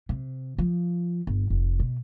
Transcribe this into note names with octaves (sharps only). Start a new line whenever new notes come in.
C3
F3
G1
F1
B2